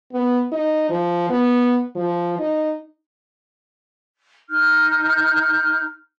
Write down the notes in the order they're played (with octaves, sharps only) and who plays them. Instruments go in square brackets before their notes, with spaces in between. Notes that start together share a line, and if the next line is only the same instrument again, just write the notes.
[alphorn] B3
D#4
F3
B3
F3
D#4
[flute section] D#4 F6 G6